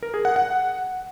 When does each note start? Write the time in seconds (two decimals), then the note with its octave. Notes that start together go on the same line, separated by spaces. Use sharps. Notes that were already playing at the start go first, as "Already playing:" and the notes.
0.03 A#4
0.14 G#4
0.25 F#5
0.36 F#5